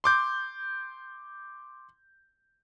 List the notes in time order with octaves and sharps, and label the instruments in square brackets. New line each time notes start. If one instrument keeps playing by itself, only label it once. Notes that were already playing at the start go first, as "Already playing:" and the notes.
[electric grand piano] C6 D6 G6